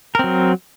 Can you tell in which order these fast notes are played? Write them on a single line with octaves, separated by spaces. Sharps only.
A#4 C4 F#3